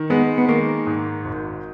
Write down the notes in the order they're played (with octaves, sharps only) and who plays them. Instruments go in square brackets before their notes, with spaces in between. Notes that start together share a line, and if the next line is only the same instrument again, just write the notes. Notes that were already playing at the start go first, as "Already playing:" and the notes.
Already playing: [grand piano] D#3
[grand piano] G#3 [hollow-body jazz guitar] B3
[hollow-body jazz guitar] B3
[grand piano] D#3 [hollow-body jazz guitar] A#3
[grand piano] G#2
G#1